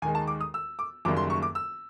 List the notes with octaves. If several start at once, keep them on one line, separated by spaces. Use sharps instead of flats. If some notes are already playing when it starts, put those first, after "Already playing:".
D#2 D#3 G#3 G#5
A5
D6
D#6
E6
D6
F#1 F#2 D#3 G3 A#3 D6
C6
C#6
D6
E6